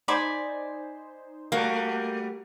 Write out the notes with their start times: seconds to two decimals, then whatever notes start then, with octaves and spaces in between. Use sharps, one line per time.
0.08 D#4 C5 D5 G#5 B5
1.52 G3 A3 A#3 F#4